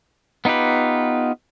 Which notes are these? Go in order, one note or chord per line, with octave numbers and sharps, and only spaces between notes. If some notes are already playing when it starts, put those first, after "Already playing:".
B3 D#4 F4 G4 B4